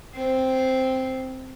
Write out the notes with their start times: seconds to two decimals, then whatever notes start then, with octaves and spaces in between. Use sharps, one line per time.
0.15 C4